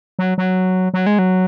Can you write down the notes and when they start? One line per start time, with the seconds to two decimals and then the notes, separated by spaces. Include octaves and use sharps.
0.19 F#3
0.38 F#3
0.94 F#3
1.06 G#3
1.19 F#3